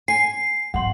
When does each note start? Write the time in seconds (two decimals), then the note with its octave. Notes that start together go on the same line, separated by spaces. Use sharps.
0.08 G#5 C7
0.74 G#1 F#5 C6